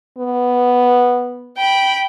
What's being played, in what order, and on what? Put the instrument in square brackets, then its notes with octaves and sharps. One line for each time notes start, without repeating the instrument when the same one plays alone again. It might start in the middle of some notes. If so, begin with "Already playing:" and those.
[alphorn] B3
[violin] G5 B5